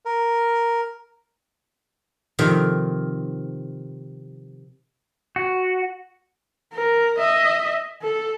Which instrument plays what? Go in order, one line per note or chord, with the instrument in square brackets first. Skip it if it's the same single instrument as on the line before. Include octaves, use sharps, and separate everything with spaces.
[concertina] A#4
[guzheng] C3 D#3 F3
[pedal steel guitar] F#4
[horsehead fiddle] A#4
D#5 E5
A4